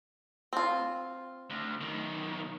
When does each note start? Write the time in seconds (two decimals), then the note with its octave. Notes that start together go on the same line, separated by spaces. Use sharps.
0.53 C4 F4
1.50 D2
1.81 B1 D#3